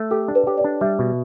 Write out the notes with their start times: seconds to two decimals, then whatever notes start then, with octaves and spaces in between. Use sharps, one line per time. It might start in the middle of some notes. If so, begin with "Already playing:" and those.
Already playing: A3
0.11 G4 A4
0.28 D4
0.35 B4
0.47 G4 C#5
0.58 D5
0.64 D4
0.81 G3 E5
0.99 B2